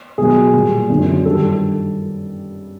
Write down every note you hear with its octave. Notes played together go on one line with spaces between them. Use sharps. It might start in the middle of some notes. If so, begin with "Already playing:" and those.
B2 F#3 G#4
A#2 G3
F#2 D3 F#3
G2 D#3 G3 A4